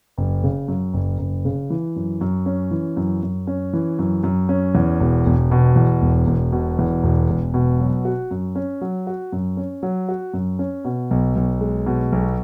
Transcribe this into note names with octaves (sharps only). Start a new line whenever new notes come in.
F#1
C#3
F#2
F#1
F#1
C#3
E3
F#2
F#2
C#4
E3
F#2
F#2
C#4
E3
F#2
F#2
C#4
E2
E1
E1
B2
E2
E1
E1
B2
E2
E1
E1
B2
F#3
F#4
F#2
C#4
F#3
F#4
F#2
C#4
F#3
F#4
F#2
C#4
B2
B1
B1
G#3
B2
B1